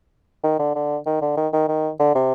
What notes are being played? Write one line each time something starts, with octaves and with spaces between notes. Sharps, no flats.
D#3
D3
D3
D#3
D3
D#3
D#3
D#3
D3
C3